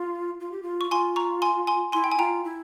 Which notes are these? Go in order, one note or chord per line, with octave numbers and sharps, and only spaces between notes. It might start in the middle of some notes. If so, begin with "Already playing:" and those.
Already playing: F4
F4
G4
F4
C#6
F4 G#5 C6
A#5 C#6
G#5 C6
G#5 C6
E4 G#5 C6
G5
G#5
F4 G5 A#5
E4